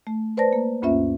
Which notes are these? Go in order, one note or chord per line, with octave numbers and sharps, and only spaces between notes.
A3
B4 C5 D5 A5 A#6
A#3
D2 G2 A#3 C#4 F4 E5